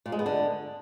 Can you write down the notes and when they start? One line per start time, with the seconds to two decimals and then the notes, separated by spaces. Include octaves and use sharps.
0.06 A#2
0.12 G#3
0.19 B3
0.26 D3